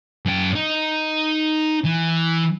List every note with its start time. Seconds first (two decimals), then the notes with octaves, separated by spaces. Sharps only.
0.26 F#2 G5
0.55 D#4
1.85 E3